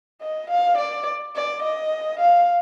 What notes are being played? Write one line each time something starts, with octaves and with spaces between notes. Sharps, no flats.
D#5
F5
D5
D5
D#5
F5